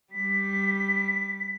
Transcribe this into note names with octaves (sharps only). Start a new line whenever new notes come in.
G3 B6